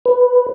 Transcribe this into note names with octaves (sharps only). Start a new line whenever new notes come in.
B4